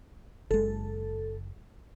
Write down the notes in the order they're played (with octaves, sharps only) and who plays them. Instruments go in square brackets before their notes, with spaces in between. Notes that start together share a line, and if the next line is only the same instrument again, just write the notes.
[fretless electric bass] F#1 G#3 [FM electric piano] A4